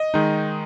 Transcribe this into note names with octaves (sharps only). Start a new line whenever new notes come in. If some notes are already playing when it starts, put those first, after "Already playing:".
Already playing: D#5
D#3 G#3 D#4